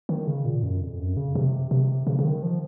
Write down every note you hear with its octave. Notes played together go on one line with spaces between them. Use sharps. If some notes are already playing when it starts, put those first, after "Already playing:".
D#3
C#3
A#2
F#2
F2
F#2
C#3
C3
C3
C#3
C#3
D#3
F3